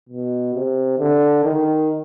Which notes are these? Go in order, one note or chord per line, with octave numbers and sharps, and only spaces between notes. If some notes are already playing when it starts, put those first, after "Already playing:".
B2
C3
D3
D#3